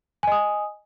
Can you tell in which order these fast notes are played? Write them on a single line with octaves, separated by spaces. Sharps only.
G#5 D#5 D#6